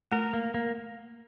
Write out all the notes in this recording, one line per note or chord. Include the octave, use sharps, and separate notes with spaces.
A3 A#4
A#3
A#3